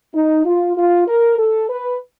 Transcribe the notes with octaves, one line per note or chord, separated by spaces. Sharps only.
D#4
F4
F4
A#4
A4
B4